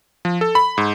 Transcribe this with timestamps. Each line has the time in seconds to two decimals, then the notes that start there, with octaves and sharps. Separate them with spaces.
0.25 F3
0.41 A4
0.55 B5
0.78 G#2